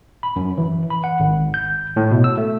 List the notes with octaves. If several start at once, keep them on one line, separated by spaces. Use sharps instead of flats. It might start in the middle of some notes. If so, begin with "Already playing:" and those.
B5
F#2
E3
B5
F#5
G#1
G6
A2
B2
E6
A3